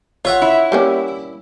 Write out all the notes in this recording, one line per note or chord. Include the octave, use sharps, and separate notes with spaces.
F4 C#5 E5 F#5
E4
G3 A#3 C#4